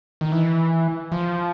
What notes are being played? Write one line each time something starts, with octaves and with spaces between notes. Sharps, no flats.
D#3
E3
F3